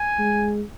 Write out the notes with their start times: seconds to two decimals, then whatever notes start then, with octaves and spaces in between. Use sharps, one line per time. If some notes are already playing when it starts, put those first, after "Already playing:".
Already playing: G#5
0.19 G#3